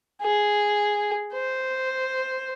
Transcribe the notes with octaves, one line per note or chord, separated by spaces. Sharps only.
G#4
C5